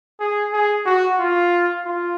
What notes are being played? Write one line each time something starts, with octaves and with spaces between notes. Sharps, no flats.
G#4
G#4
F#4
F4
F4